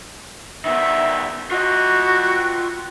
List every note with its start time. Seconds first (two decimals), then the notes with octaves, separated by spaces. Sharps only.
0.65 D#3 B3 E5
1.51 F4 F#4 D#5